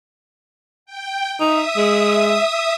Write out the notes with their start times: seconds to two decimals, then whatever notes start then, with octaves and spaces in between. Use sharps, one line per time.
0.86 G5
1.40 D#4 E5 D#6
1.77 G#3